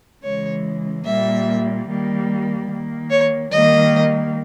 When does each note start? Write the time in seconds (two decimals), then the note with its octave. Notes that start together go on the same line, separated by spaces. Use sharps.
0.23 C#3 E3 G#3 C#5
1.05 A#2 G3 A#3 E5
1.87 D#3 G3 A#3
2.68 D#3 A#3
3.09 C#5
3.49 D#3 G3 A#3 D#5